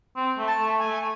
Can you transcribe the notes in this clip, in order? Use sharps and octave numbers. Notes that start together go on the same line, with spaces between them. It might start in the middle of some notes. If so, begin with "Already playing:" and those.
C4
A3
A5
A3
G#5
A3